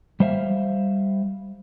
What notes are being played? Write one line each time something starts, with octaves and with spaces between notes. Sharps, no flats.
G3 C5 E5 F5